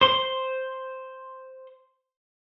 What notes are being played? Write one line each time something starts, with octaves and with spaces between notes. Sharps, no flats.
C5 C6